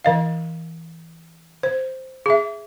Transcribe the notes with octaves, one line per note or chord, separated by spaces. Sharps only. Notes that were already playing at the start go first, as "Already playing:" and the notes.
E3 D#5 F5
C5
G#4 E5